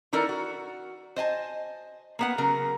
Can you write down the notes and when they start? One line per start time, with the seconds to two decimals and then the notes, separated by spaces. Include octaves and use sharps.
0.13 E3 D#4 A4 A#4 D5
0.29 F#4
1.16 C5 D#5 G#5 A5
2.19 A#3 B3 F#5
2.38 C#3 F#3 A#4